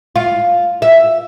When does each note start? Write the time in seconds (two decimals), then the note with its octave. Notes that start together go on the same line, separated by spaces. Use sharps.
0.16 F4
0.82 E5